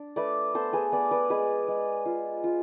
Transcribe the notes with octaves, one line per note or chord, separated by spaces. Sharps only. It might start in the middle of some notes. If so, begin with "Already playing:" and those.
Already playing: D4
A3 B4 D5
B3 A4 C5
G#4 B4
B3 B4 D5
B4 D5
G#3 G#4 B4
G#3
F4
F4